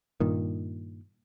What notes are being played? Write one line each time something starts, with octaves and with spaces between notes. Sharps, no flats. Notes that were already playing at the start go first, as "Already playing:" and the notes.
G2 A#2 D#3